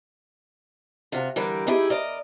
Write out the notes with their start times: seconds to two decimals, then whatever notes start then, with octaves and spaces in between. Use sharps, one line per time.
1.12 C3 F4 F#4
1.36 D3 E3 G3 A#4
1.67 D#4 E4 G4 G#4
1.90 A#4 D5 D#5